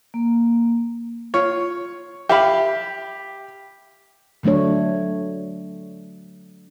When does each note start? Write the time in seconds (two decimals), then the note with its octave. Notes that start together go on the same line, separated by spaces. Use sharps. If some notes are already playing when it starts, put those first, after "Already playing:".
0.14 A#3
1.34 F4 C#5
2.29 G4 E5 F5 B5
4.43 D3 F#3 A3 D4 C#5